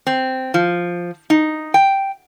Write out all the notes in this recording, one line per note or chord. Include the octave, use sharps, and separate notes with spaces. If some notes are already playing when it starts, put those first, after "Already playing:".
C4
F3
D#4
G5